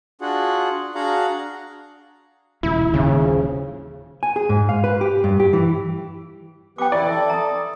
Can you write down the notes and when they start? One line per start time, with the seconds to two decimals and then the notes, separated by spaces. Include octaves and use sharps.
0.21 D4 F4 F#4 G#4 F#5
0.95 D4 F#4 G#4 F5 F#5 A#5
2.63 D#1 C#2 E4
2.94 D#1 G#1 D#2 C#3
3.24 F3
4.23 G#5
4.36 G#4
4.49 G#2
4.69 F5
4.84 B4
5.01 G4
5.24 G2
5.40 G4
5.53 E3
6.78 B3 G4 B4 G5 D6
6.92 E3 E4 D5
7.08 A4 E5
7.30 A#5 D#6